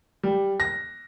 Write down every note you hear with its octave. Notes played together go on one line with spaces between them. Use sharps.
G3
A#6